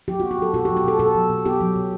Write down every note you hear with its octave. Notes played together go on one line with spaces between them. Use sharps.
F#3 G4
B3 F#4
G4
F#3 A4
B2 F#4
G4
F#3
G4
B2 A4
B2 A4
F#3
B2
B3 G4
F#3
B2